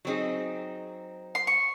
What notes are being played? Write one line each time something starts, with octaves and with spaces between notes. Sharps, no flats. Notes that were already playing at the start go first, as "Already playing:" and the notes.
F#3 C4 D#4 G#4
C6
C#6